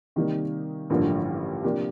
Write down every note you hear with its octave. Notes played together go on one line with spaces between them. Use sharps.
C3 D#3 G3 A#3 D#4
A1 G2 D3 F3 A#3
C3 F3 A#3 D4 G4